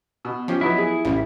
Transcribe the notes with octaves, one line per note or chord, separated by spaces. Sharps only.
B2
F3 C#4 G4
F#3 B3 D#4 E4
G#4
A1 C#3 G3